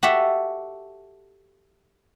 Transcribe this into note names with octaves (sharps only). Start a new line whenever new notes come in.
F#4 G4 A4 E5